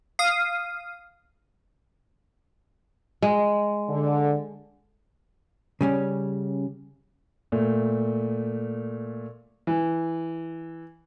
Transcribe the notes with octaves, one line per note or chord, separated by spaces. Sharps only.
F5 D#6
G#3
D3
C#3 G3 C#4
A#2 A3
E3